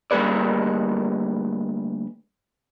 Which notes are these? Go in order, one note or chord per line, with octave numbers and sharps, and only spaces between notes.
D2 G3 A#3 G#4 B4 D5